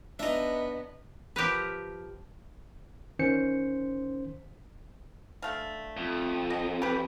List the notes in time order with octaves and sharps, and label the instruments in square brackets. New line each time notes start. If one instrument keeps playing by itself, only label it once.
[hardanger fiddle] B3 [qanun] D4 A#5 [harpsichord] D#4 E5 [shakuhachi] D#5
[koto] F3 G4 A#4 B4
[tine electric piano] D#3 C#4 C5 C6 C#7
[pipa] D3 A3 F5
[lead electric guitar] F2
[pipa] D#5
G4 B4